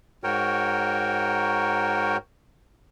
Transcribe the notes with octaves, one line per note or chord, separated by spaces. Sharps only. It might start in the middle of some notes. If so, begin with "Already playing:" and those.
G#2 F#4 A#4 C#5 G5